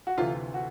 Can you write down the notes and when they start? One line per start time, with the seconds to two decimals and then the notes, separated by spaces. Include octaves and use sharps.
0.07 F#4
0.18 D2 C3 E3 F4
0.54 F#4